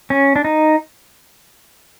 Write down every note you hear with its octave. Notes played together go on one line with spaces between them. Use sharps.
C#4
D4
D#4